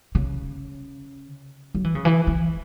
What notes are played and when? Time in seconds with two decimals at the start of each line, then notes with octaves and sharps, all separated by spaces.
0.15 C#3
1.74 F#3
1.84 E3
1.95 C#3
2.05 E3
2.27 E3